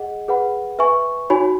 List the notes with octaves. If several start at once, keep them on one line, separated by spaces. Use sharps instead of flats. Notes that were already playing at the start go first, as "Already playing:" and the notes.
Already playing: G#4 D#5 F#5
G#4 B4 F#5 B5
B4 E5 G#5 C#6
D#4 F#4 C#5 G#5 B5